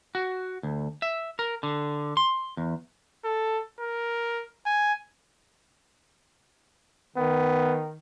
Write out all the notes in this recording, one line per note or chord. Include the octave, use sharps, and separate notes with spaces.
F#4
D2
E5
A#4
D3
C6
E2
A4
A#4
G#5
D#3 B3